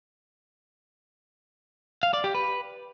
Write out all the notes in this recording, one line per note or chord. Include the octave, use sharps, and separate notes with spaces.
F5
D5
G4
B4